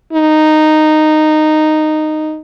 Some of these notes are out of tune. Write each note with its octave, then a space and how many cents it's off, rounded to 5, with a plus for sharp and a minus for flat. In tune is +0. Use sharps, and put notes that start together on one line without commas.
D#4 -10